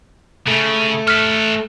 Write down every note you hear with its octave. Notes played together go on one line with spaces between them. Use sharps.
C#3 A3
A4 B4 F6 B6